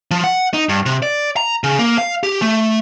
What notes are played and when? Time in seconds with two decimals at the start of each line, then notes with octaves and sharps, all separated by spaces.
0.11 F3
0.24 F#5
0.54 D#4
0.69 G2
0.86 C3
1.03 D5
1.37 A#5
1.64 C#3
1.79 A#3
1.98 F5
2.23 G4
2.42 A3